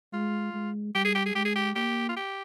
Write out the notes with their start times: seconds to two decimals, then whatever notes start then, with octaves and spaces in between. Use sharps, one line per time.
0.13 G#3 F4
0.54 G#3
0.95 G3 G4
1.05 G#4
1.15 G4
1.26 G#4
1.35 G#3 G4
1.45 G#4
1.56 G4
1.76 A#3 G4
2.09 F4
2.17 G4